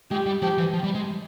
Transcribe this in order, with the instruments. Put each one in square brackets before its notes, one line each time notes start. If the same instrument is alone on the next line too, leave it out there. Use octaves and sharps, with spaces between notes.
[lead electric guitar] G#3 [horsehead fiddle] G4
[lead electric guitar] G3
[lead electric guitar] F3 [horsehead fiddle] G4
[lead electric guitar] E3
F3
G3
G#3